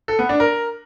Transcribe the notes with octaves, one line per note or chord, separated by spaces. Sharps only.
A4
B3
D4
A#4